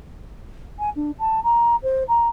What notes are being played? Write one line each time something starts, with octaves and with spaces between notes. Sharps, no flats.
G#5
D4
A5
A#5
C5
A#5